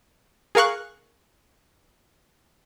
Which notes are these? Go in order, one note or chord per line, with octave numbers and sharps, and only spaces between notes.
G#4 A#4 F5 C#6 F#6